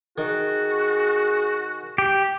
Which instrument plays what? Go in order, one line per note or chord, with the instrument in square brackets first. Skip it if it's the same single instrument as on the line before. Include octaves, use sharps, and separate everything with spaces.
[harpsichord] D#3 [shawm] F#4 [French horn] G#4
[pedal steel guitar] G4